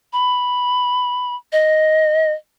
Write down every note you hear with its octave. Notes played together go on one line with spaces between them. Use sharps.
B5
D#5